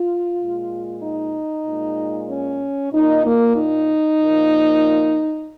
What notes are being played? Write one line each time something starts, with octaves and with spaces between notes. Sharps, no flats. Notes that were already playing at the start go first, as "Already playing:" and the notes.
Already playing: F4
A#2 G#3
D#4
A#2 G#3
C#4
A#2 A#3 D#4
A#3
D#4
A#2 F3 A#3